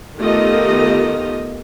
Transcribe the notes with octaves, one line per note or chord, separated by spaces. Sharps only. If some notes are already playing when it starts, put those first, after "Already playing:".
D#3 A3 B3 F4 G4 D#5